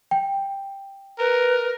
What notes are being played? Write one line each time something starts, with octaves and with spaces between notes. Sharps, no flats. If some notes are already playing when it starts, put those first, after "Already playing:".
G5
A#4 B4